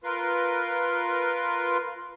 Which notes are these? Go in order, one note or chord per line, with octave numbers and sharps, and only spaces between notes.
F4 A#4 B4 C6